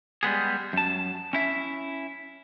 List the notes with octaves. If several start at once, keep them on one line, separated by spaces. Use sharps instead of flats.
G3 G#3 B3 G#4
F#2 A5
C#4 E4 E5